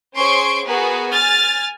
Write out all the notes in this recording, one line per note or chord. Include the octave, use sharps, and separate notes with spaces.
C#4 G#4 C5 C6 C#6 D7
B3 F#4 G#4 A#4 B4
G#5 F6 A6